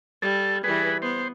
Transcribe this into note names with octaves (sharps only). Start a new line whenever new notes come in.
G3 A4
E3 G3 G#4 B4
B3 C5